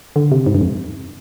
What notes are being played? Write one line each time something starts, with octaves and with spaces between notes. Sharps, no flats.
D3
C3
G#2
G2
F2